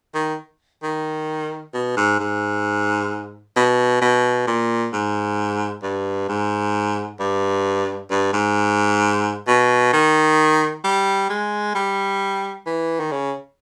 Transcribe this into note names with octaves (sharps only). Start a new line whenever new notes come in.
D#3
D#3
B2
G#2
G#2
B2
B2
A#2
G#2
G2
G#2
G2
G2
G#2
B2
D#3
G3
G#3
G3
E3
D#3
C#3